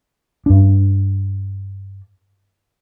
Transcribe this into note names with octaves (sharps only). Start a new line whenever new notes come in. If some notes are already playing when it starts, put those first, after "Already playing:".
G2 D4